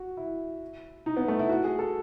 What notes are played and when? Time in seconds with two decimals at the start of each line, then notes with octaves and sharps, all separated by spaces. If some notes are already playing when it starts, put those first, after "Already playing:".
Already playing: F#4
0.17 E4
1.06 D#4
1.17 B3
1.28 A3
1.39 E4
1.49 F#4
1.64 G#4
1.79 A4